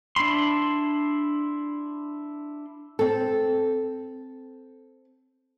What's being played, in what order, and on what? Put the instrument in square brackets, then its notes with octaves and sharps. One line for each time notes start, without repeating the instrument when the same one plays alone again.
[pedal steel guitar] D4 E4 B5 C6
[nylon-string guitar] C4 A4